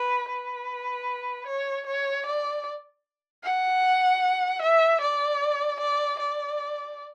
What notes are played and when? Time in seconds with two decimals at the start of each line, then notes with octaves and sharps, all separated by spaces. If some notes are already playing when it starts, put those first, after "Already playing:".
Already playing: B4
0.29 B4
1.47 C#5
1.87 C#5
2.26 D5
3.44 F#5
4.62 E5
5.01 D5
5.80 D5
6.19 D5